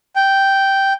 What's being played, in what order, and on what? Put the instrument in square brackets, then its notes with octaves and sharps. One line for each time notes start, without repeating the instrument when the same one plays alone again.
[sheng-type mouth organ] G5